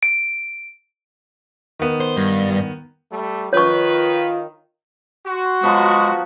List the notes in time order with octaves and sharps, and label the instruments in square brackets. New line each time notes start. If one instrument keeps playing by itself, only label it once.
[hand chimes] D7
[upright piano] D#3 B3
[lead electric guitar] C5
G2
[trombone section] G3 A3
[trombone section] D#3 [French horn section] F4 [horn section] B4 [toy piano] C#5 C#6
[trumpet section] F#4 C6
[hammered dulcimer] F3 F#3 B3 [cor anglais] G#3